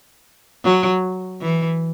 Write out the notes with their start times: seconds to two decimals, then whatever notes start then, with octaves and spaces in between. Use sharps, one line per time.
0.64 F#3
1.41 E3